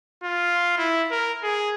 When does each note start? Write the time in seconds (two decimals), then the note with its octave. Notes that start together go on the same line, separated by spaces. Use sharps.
0.24 F4
0.78 E4
1.11 A#4
1.43 G#4